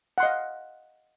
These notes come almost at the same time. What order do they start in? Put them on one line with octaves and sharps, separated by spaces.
F#5 C6 D#5 F5